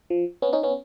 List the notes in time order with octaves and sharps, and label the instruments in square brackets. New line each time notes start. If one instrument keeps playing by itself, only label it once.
[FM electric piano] F3
B3 C#4
C#4 D#4
B3 C#4